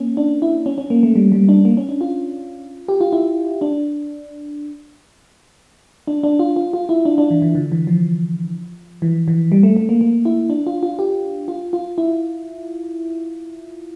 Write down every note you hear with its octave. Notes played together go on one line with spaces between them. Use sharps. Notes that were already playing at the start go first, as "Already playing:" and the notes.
Already playing: A#3 C#4
D4
E4
C#4
C#4
A#3
A3
G3
G3
D4
A#3
C#4
D4
F4
G4
F4
E4
D4
D4
D4
F4
F4
F4
E4
D4
D4
E3
E3
D3
E3
F3
E3
E3
G3
A3
A3
A#3
A#3
E4
D4
F4
F4
G4
F4
F4
E4